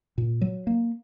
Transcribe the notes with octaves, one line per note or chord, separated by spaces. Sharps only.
A#2
F#3
A#3